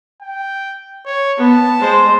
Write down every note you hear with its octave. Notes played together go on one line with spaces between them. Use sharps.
G5
C#5
B3 A5
G#3 C5